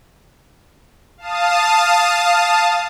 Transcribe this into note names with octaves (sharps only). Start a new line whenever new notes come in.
F5 A5 D#6